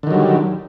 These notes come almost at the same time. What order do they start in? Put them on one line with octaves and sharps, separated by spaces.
D3 D#3 F#3 G3